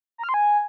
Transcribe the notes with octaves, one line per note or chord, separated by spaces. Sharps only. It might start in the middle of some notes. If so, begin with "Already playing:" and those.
A#5
F6
C6
G#5